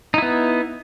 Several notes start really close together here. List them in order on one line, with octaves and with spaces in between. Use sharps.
D#4 E4 B3